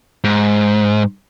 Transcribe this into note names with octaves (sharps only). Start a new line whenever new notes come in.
G#2